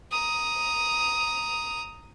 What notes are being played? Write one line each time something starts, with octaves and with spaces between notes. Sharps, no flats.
A#5 D#6